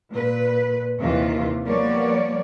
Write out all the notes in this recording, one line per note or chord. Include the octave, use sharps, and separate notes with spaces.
A#2 B4
D#2 C3 D#3 E3 F4
F3 G3 A#3 B3 C#5 D5